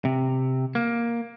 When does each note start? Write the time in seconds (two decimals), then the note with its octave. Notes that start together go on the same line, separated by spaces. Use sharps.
0.05 C3
0.75 A#3